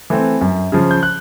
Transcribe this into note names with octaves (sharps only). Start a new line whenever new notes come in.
E3 A3 C4
F#2
C#3 F3
G6
F#6